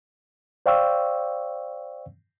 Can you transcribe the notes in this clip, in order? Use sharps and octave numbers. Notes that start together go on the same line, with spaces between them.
C5 D5 F5 G5 C#6 E6